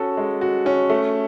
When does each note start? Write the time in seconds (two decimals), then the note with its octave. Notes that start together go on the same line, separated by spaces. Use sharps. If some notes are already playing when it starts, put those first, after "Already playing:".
Already playing: C#4 F#4 A4
0.17 G#3
0.41 F#4
0.66 C#4
0.90 A3